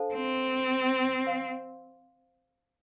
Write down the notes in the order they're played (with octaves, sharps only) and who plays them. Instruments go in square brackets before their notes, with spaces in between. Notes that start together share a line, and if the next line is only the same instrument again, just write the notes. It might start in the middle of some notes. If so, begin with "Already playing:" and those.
Already playing: [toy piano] D4 A4 C5 F5 A5
[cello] C4
[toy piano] C5 F5 C6